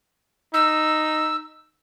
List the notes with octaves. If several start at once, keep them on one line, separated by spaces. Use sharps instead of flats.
D#4 E6